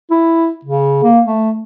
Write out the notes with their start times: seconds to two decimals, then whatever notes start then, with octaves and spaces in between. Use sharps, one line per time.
0.11 E4
0.65 C#3
1.03 A#3
1.26 A3